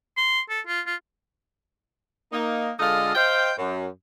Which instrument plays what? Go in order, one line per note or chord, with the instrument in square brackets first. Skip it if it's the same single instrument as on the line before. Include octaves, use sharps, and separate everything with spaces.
[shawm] C6
A4
F4
F4
[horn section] A#3 D#4
D3 G#3 F4 A4 D#5 F5
C5 D#5 F5 G5
F#2